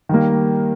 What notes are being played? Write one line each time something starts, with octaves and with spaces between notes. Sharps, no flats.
D#3 G3 A#3